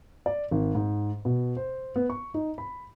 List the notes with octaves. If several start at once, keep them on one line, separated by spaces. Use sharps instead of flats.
D5
G#1
G#2
B2
C5
B3
C#6
D#4
B5